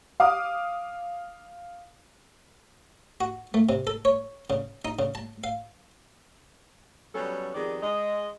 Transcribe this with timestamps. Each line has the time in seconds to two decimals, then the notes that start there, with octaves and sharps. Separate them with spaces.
0.20 F5 D6 D#6 F6
3.21 F#4
3.54 A3
3.69 C3
3.87 A4
4.05 C#5
4.50 C#3
4.85 D#4
4.99 C#3
5.15 A5
5.44 F5
7.15 F#3 G3 B3 C#4 A4
7.55 F2 D#3 B3 G4 G#4 D5
7.83 G#3 D#5